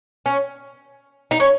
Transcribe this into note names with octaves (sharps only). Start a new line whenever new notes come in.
C#4
D#4
C#4